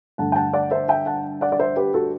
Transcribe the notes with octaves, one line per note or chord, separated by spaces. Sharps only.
G2 D3 A3 F#5 A5
G5
F#5 A5
D5 F#5
C5 E5
E5 G5
F#5 A5
D5 F#5
D5
C5 E5
G4 B4
F#4 A4